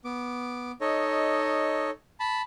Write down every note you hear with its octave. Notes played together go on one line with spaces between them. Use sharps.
B3 D6
D#4 A4 C#5 D#5
A5 B5